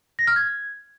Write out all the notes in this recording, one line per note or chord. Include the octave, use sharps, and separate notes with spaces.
A#6
F6
G#6